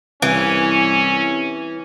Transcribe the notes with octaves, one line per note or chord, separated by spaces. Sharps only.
C2 E3 C#4